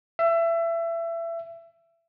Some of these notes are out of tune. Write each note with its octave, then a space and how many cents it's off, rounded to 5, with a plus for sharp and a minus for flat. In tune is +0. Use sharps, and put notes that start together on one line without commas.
E5 +25